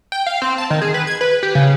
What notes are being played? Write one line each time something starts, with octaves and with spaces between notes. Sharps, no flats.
G5
F5
C4
A5
D#3
G#4
B4
G#6
B4
G4
C#3